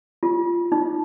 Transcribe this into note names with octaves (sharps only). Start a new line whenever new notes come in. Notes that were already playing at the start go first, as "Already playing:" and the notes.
F4
D#4